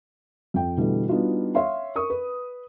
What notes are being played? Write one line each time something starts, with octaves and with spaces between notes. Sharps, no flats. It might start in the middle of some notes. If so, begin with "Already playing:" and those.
F2 G5
B2 D3 E3 G3 A3
G3 B3 D4 D#4 F4 F#4
C#5 E5 F5 C6
A#4 C#6 D#6
B4